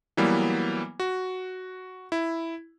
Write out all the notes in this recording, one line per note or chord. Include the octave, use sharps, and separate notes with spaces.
E3 F#3 G3 A#3 B3 E4
F#4
E4